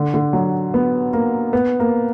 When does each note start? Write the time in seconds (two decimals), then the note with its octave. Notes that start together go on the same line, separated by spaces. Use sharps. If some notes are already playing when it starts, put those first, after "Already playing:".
Already playing: D3
0.14 D3
0.33 F#3
0.74 B3
1.13 A#3
1.53 B3
1.80 A#3